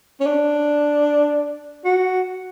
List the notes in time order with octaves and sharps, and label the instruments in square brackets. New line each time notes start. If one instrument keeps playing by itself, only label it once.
[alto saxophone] C#4
D4
F#4